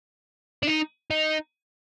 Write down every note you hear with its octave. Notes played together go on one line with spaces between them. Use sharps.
D4
D#4
D#4